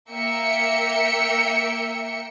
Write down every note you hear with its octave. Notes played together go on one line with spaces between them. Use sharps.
A#3 E5 G5 C#7